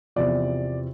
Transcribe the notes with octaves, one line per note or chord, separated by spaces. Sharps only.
E2 C3 F3 D5